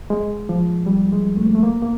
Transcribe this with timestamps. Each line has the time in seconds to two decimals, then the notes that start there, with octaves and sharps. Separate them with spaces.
0.10 G#3
0.49 F3
0.86 G3
1.12 G#3
1.37 A3
1.46 A#3
1.55 A3
1.63 A#3
1.83 A#3